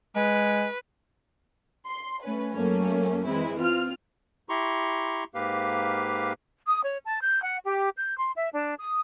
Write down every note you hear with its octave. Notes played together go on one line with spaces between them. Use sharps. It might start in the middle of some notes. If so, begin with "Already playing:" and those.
G#3 B4
C6
A3 C#4 B4
F#2 F#3 A3 A#3 C#4
E3 G#3 C4 E4
C4 F4 F6
E4 G4 A#5 C6 C#6
G#2 A#3 G4 B4 F5
D#6
C#5
A5
G6
F#5
G4
G6
C6
E5
D4
D#6